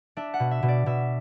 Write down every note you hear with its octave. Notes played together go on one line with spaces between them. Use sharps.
D4 E5
F#5
B2
E5
B2
D5
B2 E5